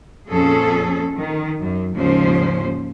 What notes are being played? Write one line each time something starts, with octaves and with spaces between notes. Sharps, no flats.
F2 A#2 F3 C#4 G#4 A4
D#3
F#2
D#2 G#2 C#3 F3 C#4 C5